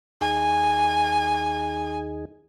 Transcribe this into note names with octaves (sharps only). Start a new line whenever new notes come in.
D#2 D#4 G#4 G#5